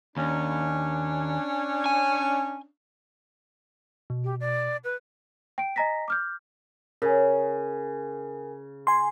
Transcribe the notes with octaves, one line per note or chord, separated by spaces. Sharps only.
D#2 C#4 D4
G#5
B2
G4
D5
B4
G5 D7
D#5 G#5 A#5 A#6 B6
D6 F6 G6
C#3 A#4 G#5
G#5 C6